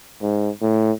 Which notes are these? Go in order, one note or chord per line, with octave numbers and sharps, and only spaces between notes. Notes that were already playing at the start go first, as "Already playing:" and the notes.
G#2
A2